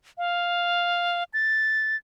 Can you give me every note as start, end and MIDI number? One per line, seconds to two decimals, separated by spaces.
0.18 1.24 77
1.34 1.96 93